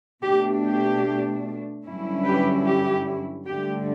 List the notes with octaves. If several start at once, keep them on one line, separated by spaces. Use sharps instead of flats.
B2 A3 D4 G4
G4
G2 D3 F#3 C#4 E4
G4 B4
G4
G2 D3 A3 G4